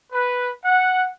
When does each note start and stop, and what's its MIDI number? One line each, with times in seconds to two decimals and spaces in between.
0.12 0.49 71
0.64 1.07 78